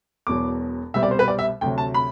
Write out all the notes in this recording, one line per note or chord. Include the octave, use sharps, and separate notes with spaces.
E1 E2 B2 F#3 D6
C2 B2 G3 C4 E5
D5
C5
B4
D5
E5
D2 C3 F#3 G5
A5
B5